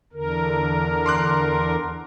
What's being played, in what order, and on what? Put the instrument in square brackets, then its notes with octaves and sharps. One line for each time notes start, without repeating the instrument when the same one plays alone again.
[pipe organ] E2 D3 A#4
[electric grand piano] C6 D6 F#6